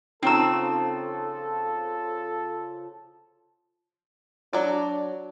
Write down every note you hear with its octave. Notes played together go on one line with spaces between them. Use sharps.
C#3 F3 C4 D#4 A4 A#5 C#6 E6
F#3 D4 D5